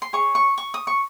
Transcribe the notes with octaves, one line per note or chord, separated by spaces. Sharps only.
C6
G#4 C#5 C#6
C#6
C#6
D#6
C#6